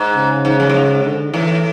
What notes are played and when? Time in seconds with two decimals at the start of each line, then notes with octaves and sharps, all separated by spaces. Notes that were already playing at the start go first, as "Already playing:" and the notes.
Already playing: G#2
0.16 C#3
0.45 G#2
0.60 F#2
0.70 A2
0.74 G#2
1.04 D3
1.32 A2 E3